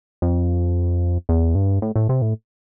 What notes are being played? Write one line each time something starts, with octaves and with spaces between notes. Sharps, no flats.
F2
E2
G2
A2
A2
C3
A2